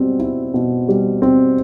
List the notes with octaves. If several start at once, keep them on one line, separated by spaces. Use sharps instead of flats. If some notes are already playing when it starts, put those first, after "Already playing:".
Already playing: B2 G3 C4
E4
B2
G3
C4